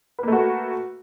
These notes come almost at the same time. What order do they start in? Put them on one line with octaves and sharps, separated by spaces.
B4 A#3 A3 F#4